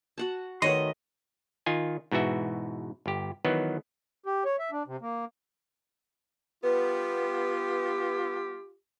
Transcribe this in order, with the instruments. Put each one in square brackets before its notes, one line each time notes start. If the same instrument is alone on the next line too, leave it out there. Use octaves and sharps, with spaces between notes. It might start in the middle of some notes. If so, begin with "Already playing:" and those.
[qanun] F#4 F#5 A5
[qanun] D#3 A3 B4 [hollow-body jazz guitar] F#4 C#5 C6 [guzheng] D#5
[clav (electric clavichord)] D#3 F4 G#5
G#2 B2 E3 F#4 E5
G1 G4
D#3 E3 F#3 B3
[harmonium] G4
C#5
E5
D4
C3
A#3
[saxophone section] G3 B3 [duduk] F4 [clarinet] G4 [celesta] B4